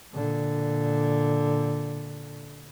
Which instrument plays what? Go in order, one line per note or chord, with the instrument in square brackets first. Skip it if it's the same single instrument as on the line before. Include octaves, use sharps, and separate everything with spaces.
[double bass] A#2 D3